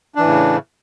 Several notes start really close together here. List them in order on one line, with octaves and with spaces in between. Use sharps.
D4 E3 A2 C#3